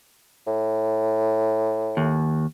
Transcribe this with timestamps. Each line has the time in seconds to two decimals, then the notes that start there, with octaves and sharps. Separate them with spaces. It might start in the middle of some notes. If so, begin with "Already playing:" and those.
0.47 A2
1.97 D#2